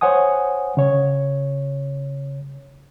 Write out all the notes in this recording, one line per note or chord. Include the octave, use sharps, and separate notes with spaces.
C5 C#5 F#5 G#5 D#6
C#3 C#5